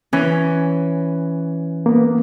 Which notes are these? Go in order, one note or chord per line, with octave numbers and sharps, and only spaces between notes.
E3 C#4
A#3 B3